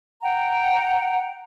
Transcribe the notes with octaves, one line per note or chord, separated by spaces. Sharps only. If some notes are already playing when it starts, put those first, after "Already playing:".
F#5 G5 A#5